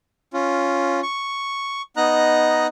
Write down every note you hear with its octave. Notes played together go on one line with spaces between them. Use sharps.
C#4 F4
C#6
B3 D#4 D#5 A#5 F#6